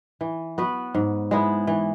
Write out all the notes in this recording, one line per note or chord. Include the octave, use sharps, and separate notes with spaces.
E3
B3 F#4 B4
G#2
G#3 B3 E4
E3